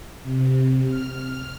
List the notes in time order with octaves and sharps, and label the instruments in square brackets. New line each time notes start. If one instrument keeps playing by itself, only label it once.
[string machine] C3
F6